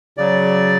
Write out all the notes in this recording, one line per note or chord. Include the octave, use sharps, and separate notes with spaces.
C#3 F#3 D5